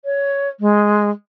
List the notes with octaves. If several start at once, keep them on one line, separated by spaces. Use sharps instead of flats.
C#5
G#3